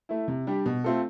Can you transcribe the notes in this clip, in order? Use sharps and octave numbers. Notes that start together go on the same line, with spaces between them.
A3 E4
C3
G3 D4 G4
B2
A3 C4 F4 A4